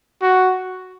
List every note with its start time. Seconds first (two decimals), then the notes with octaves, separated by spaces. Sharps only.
0.22 F#4